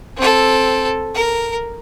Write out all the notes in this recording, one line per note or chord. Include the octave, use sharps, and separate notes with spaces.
C4 A4
A#4